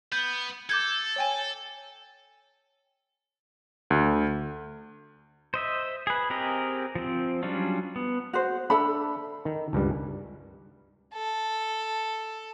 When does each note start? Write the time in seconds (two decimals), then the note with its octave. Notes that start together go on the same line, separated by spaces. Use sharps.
0.12 B3 G6
0.69 A4 D6 G6 G#6
1.16 C#5 G5 G#5
3.90 D2
5.54 C5 D#5 E5
6.07 G#4 B4
6.30 C4 G4 G#4 A#4 D#5
6.95 F3 C4
7.43 F#3 G3 C#4 D4 F4
7.96 B3
8.33 F#4 C5
8.70 D4 A4 E5 B5
9.45 D#3
9.73 C#2 G2 G3
11.14 A4